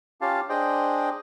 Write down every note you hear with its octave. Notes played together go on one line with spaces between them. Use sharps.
C#4 F4 G4 F5 A5
D4 G#4 C5 D#5 G5